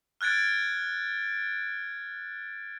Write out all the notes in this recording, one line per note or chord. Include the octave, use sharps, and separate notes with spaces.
F6 F#6 G#6 A6 D7